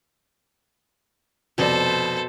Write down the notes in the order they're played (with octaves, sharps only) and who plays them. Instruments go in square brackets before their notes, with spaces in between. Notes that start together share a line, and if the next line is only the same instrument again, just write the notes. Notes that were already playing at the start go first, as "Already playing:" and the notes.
[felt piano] F1 F2 D5 [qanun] B2 [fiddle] A4 C5